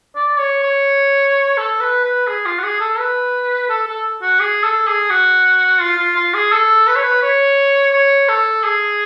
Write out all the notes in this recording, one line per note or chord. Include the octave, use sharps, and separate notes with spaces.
D5
C#5
C#5
A4
B4
B4
G#4
F4
F#4
G#4
A4
B4
A4
A4
F#4
G#4
A4
G#4
F#4
F4
F4
F4
G#4
A4
B4
C#5
B4
C#5
C#5
A4
G#4